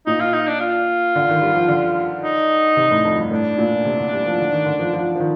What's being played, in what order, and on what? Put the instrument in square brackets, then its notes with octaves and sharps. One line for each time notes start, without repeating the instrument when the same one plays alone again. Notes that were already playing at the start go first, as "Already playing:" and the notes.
[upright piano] A#2 [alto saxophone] D#4
[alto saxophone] F4
D#4
D4
F4
[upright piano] D3
D#3
G3
F3
D3
[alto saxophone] D#4
[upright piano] C3
A2
F2
G2
[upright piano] A2 [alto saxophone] D4
[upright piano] A#2
C3
D3
G3
F3
D3
D#3
D3
F3
F3
F3
D#3